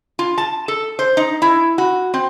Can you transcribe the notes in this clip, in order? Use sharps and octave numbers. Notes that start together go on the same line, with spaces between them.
F4
A5
A4
C5
D#4
E4
F#4
C4